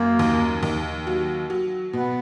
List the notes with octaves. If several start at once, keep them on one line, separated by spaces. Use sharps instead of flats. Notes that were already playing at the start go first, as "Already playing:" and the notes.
Already playing: F#2 A#3
D#2
D#2
F#3
F#3
B2 B3